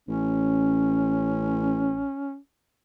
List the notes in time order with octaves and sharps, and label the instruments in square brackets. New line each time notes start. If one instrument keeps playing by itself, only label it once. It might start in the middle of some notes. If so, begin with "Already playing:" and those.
[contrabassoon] A1 [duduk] C#4